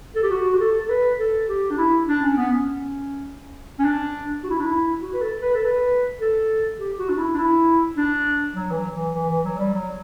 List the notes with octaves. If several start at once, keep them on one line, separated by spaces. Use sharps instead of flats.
A4
G4
F#4
G4
A4
A4
B4
A4
G4
D4
E4
D4
C#4
B3
C#4
C#4
D4
F#4
E4
D4
E4
F#4
B4
A4
B4
A4
B4
A4
G4
F#4
D4
E4
D4
E4
D4
F#3
E3
F#3
E3
E3
E3
F#3
G3
F#3